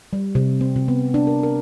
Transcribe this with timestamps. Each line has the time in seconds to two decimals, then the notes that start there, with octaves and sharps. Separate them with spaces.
0.13 G3
0.35 C3
0.61 C4
0.76 C3
0.88 B3
1.14 D4
1.27 A#4
1.43 A#4